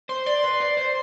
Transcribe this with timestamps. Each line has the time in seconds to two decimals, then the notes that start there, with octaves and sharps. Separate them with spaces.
0.09 C5 C6
0.26 D5 C6
0.44 B4
0.60 D5
0.77 C5